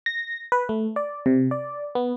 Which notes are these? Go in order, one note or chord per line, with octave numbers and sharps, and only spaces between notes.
A#6
B4
A3
D5
C3
D5
B3